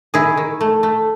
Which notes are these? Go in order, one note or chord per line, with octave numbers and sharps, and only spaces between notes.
D#3 E4 G#4
D#3
A3
A3